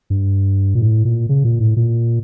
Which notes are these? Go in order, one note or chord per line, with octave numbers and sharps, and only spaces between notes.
G2
A#2
A2
A#2
C#3
A#2
A2
A#2